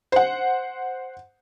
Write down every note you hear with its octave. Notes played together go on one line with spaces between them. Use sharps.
C5 F#5